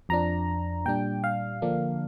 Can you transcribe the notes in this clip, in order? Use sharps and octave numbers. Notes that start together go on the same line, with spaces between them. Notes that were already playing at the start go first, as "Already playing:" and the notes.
F2 F3 D4 A#5
A#2 G3 D4 G5
F5
D3 F3 A#3 D4